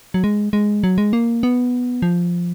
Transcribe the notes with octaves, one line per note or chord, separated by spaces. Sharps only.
F#3
G#3
G#3
F#3
G#3
A#3
B3
F3